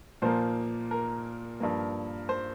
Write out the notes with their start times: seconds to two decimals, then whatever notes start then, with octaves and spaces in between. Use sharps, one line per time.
0.22 A#2 F3 A#3 C5
0.91 A#4
1.60 G2 F3 A#3
2.29 C5